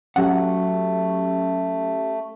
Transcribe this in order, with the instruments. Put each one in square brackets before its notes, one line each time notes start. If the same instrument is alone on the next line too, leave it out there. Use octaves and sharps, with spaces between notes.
[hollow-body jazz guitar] F#3 F#5 [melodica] A3 [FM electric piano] C#4 G4